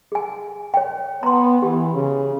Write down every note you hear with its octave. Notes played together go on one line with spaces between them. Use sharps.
G#4 G#5
C#5 G5
B3 A#5 C6
E3 G4
C#3